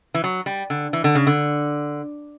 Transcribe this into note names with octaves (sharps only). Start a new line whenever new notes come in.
E3
F#3
G3
D3
E3
D3
C#3
D3